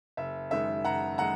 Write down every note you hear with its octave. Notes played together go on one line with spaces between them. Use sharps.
F#1 E5
F#2 D#3 G#3 E5
F#1 F#5 A#5
D#3 G#3 F#5 A#5